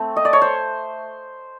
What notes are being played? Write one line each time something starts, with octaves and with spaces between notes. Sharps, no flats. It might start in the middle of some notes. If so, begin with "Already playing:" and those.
Already playing: A3 C4
D#5
D5
C#5
C5